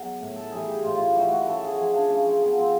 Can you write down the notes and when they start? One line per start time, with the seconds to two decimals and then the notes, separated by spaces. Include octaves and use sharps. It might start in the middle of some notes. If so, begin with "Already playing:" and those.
Already playing: B2 F#3 G#4
0.20 A2
0.36 A4
0.51 E3 G3 G#4
0.67 G4
0.83 A2 F4
0.94 F4
0.99 E4
1.15 E3 G3 F#4
1.31 F#4
1.46 C#3 A4
1.62 G#4
1.78 F3 G#4
1.94 D4
2.09 C#3 C#4
2.26 C4
2.41 F3 B3
2.58 C4